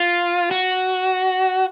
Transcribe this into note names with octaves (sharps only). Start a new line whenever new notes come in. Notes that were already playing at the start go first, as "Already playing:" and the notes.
Already playing: F4
F#4